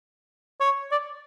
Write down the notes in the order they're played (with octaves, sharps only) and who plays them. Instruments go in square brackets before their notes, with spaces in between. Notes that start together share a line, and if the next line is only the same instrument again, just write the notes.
[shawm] C#5
D5